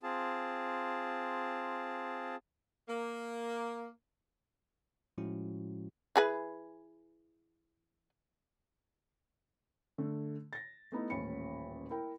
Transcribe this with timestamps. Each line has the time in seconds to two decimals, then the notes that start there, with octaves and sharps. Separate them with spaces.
0.03 C4 F4 G#4 A5
2.88 A#3
5.18 A2 F3 G#3 C#4 E4 F#4
6.16 E3 G#4 B4
9.98 D3 A3
10.53 A6 A#6
10.92 A3 B3 D#4 E4
11.10 D#1 A1 C#4 B5 C#7
11.90 E4 A#4 G5